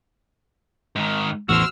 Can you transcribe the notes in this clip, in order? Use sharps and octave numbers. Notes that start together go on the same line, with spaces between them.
G#2 D#3
A1 E2 A2 F#4 C5 E6 F6